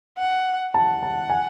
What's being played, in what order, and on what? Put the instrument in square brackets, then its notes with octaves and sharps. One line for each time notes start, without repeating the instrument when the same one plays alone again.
[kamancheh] F#5
[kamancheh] F#5 [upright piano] A5
[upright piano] A5
G#5